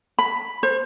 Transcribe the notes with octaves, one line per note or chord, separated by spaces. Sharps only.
B5
C5